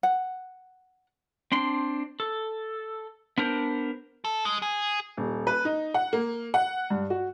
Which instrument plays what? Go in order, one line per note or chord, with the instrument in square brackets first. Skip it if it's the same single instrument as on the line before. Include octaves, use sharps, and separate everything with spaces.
[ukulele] F#5
[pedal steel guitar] C4 D4 C6
A4
B3 D4 A#4 C5
[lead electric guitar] A4
G#3
G#4
[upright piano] D#1
B4
D#4
F#5
A#3
F#5
G2
F#4